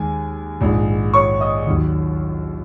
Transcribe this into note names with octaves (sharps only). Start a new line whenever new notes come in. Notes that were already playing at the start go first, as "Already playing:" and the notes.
Already playing: D#2 D#3 G#3 G#5
A#1 G#2 G#3
C#5 C#6
D#5 D#6
D#2 D#3 F#3